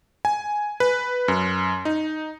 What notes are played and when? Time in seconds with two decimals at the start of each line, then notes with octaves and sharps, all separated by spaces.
0.25 G#5
0.80 B4
1.28 F#2
1.85 D#4